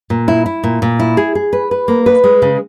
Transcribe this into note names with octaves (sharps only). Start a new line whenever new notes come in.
A#2
E4
E4
A#2
A#2
E4
G#4
G#4
B4
B4
A#3
B4
G#3
C#3